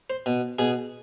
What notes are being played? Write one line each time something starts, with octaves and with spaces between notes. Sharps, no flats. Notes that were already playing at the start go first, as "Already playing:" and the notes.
C5
B2
B2 G#4